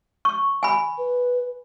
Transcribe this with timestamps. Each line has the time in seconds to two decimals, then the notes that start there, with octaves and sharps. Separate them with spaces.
0.25 C#6
0.63 G#5 B5
0.98 B4